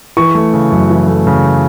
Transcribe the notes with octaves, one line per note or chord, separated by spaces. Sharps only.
E3 C#6
A3
C#3
F#2
E3
A3
C#3